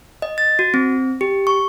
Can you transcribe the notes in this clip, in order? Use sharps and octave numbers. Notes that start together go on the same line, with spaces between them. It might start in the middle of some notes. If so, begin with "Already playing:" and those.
D#5
A6
F#4
C4
G4
C#6